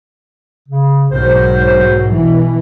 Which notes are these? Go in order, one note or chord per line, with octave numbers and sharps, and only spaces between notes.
C#3
B1 G#2 F#3 A#4 C5
B2 E3